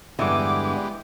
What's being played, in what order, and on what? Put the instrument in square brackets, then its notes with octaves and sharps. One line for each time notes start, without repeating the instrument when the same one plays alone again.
[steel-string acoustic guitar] E2 G2 D3 [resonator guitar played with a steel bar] E3 [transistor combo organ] G#3 B3 G4 [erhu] D6